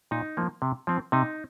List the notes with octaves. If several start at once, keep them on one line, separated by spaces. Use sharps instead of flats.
A#2 D#4
F3 A#3
C3
F3 C4
C3 D#4